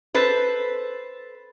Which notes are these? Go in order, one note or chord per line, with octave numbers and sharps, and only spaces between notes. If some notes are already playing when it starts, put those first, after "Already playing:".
A4 B4 C5